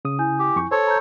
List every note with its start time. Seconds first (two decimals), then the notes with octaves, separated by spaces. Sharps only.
0.05 C#3 D#6
0.19 E4 G#5 G6
0.39 G4
0.56 F2 C#6
0.72 A4 C5 C#5
0.87 A#5 G6